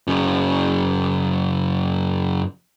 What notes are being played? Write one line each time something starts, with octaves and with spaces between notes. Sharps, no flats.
F#2 C#3